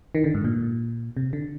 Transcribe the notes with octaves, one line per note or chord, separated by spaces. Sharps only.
D#3
D3
G#2
A#2
C3
D3